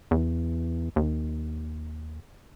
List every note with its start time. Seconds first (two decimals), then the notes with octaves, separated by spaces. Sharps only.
0.11 E2
0.96 D#2